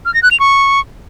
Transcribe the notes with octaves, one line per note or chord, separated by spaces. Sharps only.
F6
A#6
F#6
F7
C#6